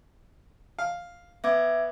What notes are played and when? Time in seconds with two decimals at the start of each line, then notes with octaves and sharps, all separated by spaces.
0.79 F5
1.44 B3 E5 D6 G#6